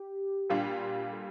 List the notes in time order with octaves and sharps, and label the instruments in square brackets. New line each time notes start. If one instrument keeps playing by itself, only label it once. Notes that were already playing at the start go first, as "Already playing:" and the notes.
Already playing: [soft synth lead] G4
[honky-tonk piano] A#2 G3 D4 F4
[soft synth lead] A4